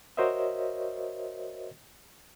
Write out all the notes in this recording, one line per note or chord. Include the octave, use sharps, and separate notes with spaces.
F#4 A#4 C5 C#5 D#5 E5